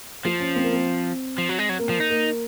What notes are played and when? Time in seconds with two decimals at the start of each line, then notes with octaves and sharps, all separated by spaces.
0.25 F3 F4
0.40 C#4
0.56 C4
0.64 A#3
0.73 C4
1.38 F3
1.49 F#3
1.59 G#3
1.69 F#3
1.79 A#3
1.89 F3
2.00 D#4
2.10 A#3